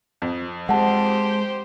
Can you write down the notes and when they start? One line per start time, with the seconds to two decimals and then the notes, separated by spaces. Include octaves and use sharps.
0.22 F2
0.69 G#3 G4 C5 F#5 A5